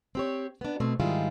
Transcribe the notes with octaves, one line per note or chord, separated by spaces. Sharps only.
C4 G4 C#5
B3 D4
B2 A3 C4
G#2 D#3 G3 E4 F4 G#4